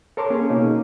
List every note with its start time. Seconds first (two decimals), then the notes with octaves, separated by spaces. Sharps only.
0.17 A4 A#4 C#5 A5 C6 D6
0.30 A#3 C#4 G#4
0.49 B2 A#3 C#4 D#4